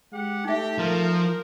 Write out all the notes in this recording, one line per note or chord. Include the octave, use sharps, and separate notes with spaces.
G#3 G4 F#5
A3 D#4 G4 E5
F3 A#4